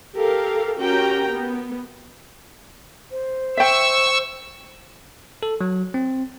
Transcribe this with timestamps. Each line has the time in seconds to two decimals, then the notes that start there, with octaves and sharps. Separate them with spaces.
0.14 G4 A4 A#4 F5
0.77 C#4 F#4 G4 A#4 G5 A#5
1.31 B3
3.12 C5
3.57 E5 G5 C#6 E6
5.43 A4
5.61 F#3
5.94 C4